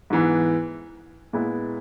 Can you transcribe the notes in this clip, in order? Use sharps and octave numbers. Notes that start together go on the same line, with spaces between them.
G#2 E3 B3
A#2 G#3 B3 E4